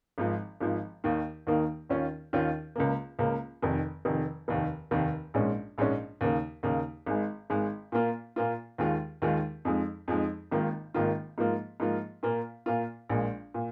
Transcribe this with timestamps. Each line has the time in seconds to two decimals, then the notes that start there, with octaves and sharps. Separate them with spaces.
0.18 G#1 G#2 F3
0.61 G#1 G#2 F3
1.04 D#2 D#3 A#3 D#4
1.47 D#2 D#3 A#3 D#4
1.90 D#2 D#3 C#4 F4
2.33 D#2 D#3 C#4 F4
2.76 C#2 C#3 A#3
3.19 C#2 C#3 A#3
3.62 F1 F2 D#3
4.05 F1 F2 D#3
4.48 F1 D#2 D#3
4.91 F1 D#2 D#3
5.34 A#1 G#2 G#3 C#4
5.78 A#1 G#2 G#3 C#4
6.21 D#2 C#3 A#3 D#4
6.63 D#2 C#3 A#3 D#4
7.06 G#1 G#2 G#3
7.50 G#1 G#2 G#3
7.92 A#2 A#3 F4
8.36 A#2 A#3 F4
8.78 D#2 D#3 G#3 F4
9.22 D#2 D#3 G#3 F4
9.65 F2 F3 G#3 D#4
10.08 F2 F3 G#3 D#4
10.51 G#1 G#2 D#3 A#3 F4
10.94 G#1 G#2 D#3 A#3 F4
11.38 G#2 F3 A#3 F4
11.80 G#2 F3 A#3 F4
12.23 A#2 A#3 F4
12.66 A#2 A#3 F4
13.09 A#1 A#2 G#3
13.54 A#2